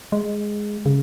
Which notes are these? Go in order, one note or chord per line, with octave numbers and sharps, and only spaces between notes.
G#3
C#3